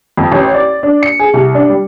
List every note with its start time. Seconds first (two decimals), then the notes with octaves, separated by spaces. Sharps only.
0.17 F2
0.32 A1
0.54 D5
0.83 D4
1.03 C#7
1.19 G#4
1.34 C2
1.54 D4
1.70 G3